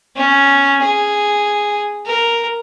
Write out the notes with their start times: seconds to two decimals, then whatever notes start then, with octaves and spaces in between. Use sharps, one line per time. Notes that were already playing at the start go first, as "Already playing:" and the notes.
0.16 C#4
0.82 G#4
2.06 A#4